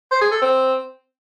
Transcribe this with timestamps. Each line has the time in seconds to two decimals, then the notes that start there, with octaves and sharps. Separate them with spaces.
0.11 C5
0.22 G#4
0.32 A4
0.42 C4